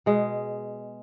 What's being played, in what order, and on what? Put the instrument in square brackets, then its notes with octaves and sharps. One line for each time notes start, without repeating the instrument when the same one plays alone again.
[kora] B2 G#3